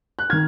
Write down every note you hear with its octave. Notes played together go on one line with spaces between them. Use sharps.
F#6
D#3 F6 G#6